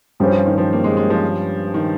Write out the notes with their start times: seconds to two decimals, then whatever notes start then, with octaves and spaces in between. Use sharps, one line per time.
0.20 G2 F3 G3 C#4 G4 C5
0.33 F3
0.46 D#3
0.58 F3
0.73 A#3
0.84 G#3
0.97 G#3
1.10 F3
1.74 D#3